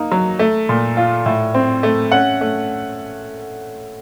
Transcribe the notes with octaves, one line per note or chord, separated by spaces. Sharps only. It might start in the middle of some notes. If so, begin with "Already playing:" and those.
Already playing: A#3 D#4
F#3
A3
A#2
F4
A2
C4
A3
C#4 F#5
A3